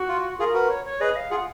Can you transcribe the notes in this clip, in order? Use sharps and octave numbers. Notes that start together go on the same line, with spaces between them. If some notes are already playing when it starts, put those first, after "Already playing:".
Already playing: F#4
F4
F4 G#4 A#4
F#4 A#4 B4
C#5
C#5
G#4 B4 D#5
F5
F4 G#4 F#5